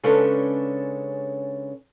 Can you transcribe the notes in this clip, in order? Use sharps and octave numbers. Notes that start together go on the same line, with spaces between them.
C#3 G#3 C#4 D4 A4 B4